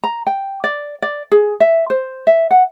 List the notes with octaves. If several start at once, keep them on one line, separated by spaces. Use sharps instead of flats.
A#5
G5
D5
D5
G#4
E5
C5
E5
F#5